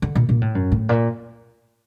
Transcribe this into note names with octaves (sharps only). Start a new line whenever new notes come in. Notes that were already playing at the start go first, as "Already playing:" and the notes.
D3
A#2
A#2
A2
F#2
A2
A#2